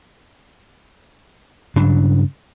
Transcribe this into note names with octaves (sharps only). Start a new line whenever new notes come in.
G2 C#3 F#3 D4